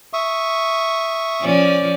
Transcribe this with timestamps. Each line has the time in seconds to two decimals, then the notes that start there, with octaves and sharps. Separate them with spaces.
0.13 E5 C#6 D#6
1.42 F3 C#4 D5